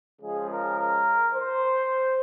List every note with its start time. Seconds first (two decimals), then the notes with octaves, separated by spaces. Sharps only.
0.21 C#3 F3 G#3 G#4
0.50 A#4
0.79 A#4
1.35 C5